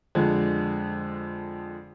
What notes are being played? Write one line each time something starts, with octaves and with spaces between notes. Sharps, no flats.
F2 D3 G#3